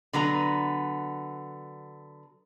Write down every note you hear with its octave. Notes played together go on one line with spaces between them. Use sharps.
D3 F#3 B3 A#5